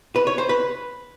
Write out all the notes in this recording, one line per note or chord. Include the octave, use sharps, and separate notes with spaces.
B4
C#5
C5
B4